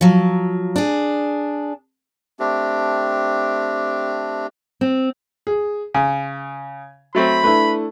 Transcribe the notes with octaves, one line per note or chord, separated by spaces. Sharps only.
F3 F#3
D4 G#4
A3 C4 D4 G4
C4
G#4
C#3 G#5
F#3 A3 C4 B5
A3 D4 E4 B4